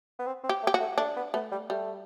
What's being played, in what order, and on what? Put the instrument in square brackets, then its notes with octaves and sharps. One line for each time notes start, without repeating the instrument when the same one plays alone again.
[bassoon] B3
C4
C4
[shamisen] G4
[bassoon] A3
[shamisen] G4
F#4
[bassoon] A3
[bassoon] A3 [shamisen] D4
[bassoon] B3
[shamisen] A3 [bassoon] B3
[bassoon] G3
[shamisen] G3 [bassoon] A3